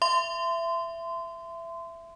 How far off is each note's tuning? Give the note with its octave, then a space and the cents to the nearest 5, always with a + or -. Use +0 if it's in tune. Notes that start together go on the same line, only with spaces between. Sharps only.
E5 +20 C6 -25